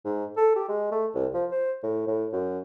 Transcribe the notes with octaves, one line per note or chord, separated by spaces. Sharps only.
G#2
A4
G4
G#3
A3
C2
F3
C5
A2
A2
F#2